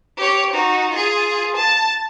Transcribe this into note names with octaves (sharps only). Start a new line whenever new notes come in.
G4 C#5
D#4 F#4
F4 G#4
A5